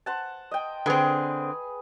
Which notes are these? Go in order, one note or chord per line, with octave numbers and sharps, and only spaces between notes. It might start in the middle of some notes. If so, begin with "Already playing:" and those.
C5 F#5 A5
D#5 G5
D3 C4 G#4 B4